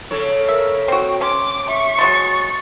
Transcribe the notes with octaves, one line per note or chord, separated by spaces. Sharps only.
C#3 A4 C#5
A#4 E5
C4 F#4 G5
C#4 C6 D6
E5 C#6
F#3 G#3 C6 A6